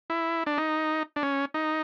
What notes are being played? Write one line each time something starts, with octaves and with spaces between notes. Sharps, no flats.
E4
D4
D#4
D4
C#4
D#4